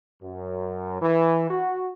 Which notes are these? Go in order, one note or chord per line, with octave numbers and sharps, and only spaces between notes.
F#2
E3
F#4